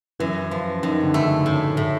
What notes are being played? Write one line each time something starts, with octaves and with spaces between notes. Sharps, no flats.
F#2 E3
F3
F#2 D#3
D3
C#3 A3
A2
A2